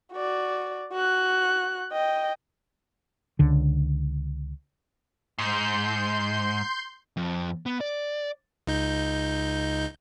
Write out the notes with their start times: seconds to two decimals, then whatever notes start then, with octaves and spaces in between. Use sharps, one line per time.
0.13 F#4 D5
0.92 F#4 F#6
1.92 D#5 G5
3.39 C#2 D3
5.38 G#2 C6 G6
7.17 F2
7.66 B3
7.81 D5
8.67 C#2 D#4 G6